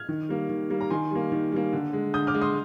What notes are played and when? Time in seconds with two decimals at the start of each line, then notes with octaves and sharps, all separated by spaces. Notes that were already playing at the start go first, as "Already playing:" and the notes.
Already playing: F6 G#6
0.09 D#3
0.29 G3 A#3
0.49 D#3
0.70 G3 A#3
0.81 A#5
0.90 D#3 G#5 C6
1.11 G3 A#3
1.32 D#3
1.52 G3 A#3
1.73 D3
1.93 G#3
2.14 D3 D#6 G6
2.27 D6 F6
2.34 G#3
2.41 C6 D#6